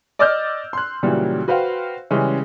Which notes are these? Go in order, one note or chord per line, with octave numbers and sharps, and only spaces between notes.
D5 D#5 D6 E6 F6 G6
C6 F#6
A#2 C#3 E3 F#3 G3
F#4 B4 C5 F5 G5
C#3 E3 G3 G#3 C#4